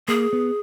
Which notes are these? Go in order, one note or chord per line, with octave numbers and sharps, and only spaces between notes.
A#3 G#4
B3